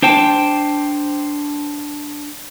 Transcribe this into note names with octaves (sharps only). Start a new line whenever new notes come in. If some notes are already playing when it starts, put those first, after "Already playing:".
D4 C5 G5 A5